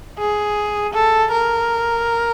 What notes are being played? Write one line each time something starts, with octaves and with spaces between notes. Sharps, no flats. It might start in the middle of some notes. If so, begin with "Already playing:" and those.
G#4
A4
A#4